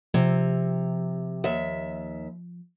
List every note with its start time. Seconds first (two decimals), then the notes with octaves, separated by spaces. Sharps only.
0.14 C3 F3
1.44 D#2 E5